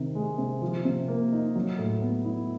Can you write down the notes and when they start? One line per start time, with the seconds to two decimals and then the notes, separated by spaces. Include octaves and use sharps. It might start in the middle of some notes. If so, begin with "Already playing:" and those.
Already playing: C3 D#3
0.15 G#3
0.38 C3
0.62 F3
0.85 C3
1.08 A#3
1.32 D#4
1.55 F#3
1.79 A2
2.02 B3
2.25 E4